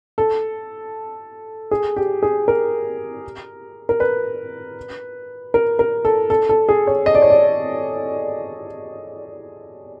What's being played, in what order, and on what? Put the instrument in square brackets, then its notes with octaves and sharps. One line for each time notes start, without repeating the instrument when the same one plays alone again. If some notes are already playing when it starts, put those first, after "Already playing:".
[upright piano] A4
G#4
G4
G#4
A#4
A#4
B4
A#4
A#4
A4
A4
A4
G#4
C#5
D#5
D5
C#5
D5